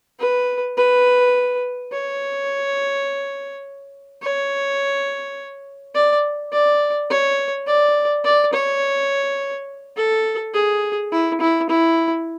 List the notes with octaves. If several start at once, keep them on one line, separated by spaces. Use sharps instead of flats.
B4
B4
C#5
C#5
D5
D5
C#5
D5
D5
C#5
A4
G#4
E4
E4
E4